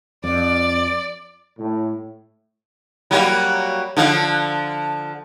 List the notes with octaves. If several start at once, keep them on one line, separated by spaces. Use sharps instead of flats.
F2 D5
A2
F#3 G3 A#3
D3 F3 F4